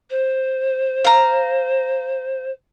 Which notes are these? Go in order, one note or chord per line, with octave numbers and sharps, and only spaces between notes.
C5
F5 A#5